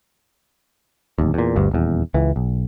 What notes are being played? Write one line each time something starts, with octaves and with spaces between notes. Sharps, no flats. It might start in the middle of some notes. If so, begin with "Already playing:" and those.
D1 D#2
E2 A#2
G1 D2 G2
D#1 E2
C#2 E3
B1